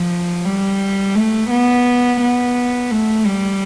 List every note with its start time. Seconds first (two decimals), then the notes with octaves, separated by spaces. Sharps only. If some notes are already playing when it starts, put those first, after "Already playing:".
Already playing: F3
0.45 G3
1.15 A3
1.50 B3
2.21 B3
2.92 A3
3.26 G3